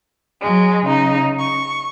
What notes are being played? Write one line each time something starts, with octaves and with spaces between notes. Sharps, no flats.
F#3 G#3
C#3 D#4
C#6